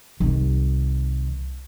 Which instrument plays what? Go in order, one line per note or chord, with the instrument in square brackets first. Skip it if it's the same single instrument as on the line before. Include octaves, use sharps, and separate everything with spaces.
[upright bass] C2 D#3